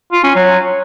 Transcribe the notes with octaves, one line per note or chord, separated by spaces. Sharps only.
F4
C#4
F#3